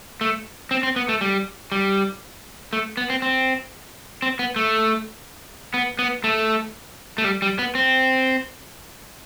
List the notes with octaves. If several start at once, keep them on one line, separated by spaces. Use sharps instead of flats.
A3
C4
C4
B3
A3
G3
G3
A3
B3
C4
C4
C4
B3
A3
B3
B3
A3
A3
G3
G3
B3
C4